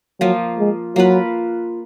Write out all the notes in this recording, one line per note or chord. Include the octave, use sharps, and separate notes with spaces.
F3 F#3 A#3 F4
G#3
F#3 A#3 F4 B4